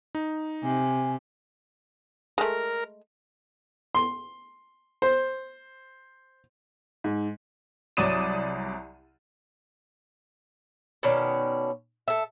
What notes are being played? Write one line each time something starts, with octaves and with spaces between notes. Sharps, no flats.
D#4
C3 G#5
G#3 A3 A#4
C6
C5
G#2
C2 F#3 D5 D#6 D#7 E7
B2 D#3 C#4 D5
A4 E5